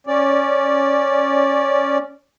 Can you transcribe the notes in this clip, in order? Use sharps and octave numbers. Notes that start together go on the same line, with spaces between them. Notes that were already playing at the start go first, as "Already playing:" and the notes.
C#4 D5